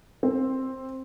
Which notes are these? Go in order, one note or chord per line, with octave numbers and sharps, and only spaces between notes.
C4